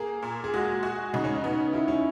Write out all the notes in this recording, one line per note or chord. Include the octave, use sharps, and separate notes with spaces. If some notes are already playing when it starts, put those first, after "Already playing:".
Already playing: A#3 G#4
A#2
G#4
G#3 F#4
F#4
C#3 D#4
C#4
D#4
B3
D#3 E4
C#4